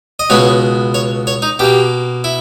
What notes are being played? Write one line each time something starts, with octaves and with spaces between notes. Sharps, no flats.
D#5
C#2 B2 G#3 B3 C#5
C#5
C#5
D#4
B2 A#3 G4
E4